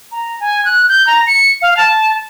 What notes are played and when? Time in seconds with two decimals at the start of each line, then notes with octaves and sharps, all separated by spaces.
0.12 A#5
0.40 G#5
0.65 F#6
0.89 G6
1.07 A#5
1.27 C#7
1.62 F5
1.77 A5